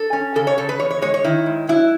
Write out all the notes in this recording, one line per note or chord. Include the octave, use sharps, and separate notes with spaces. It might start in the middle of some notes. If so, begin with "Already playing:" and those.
Already playing: A4
C#4
C#3 A4
C#5
C#3 A4
B4
E2 C#5
C#5
G#3 C#5
C#5
D#3 E4
G#2
F#3 E4